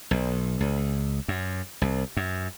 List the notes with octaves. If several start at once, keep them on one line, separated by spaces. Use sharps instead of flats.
B1
C#2
F#2
C2
F#2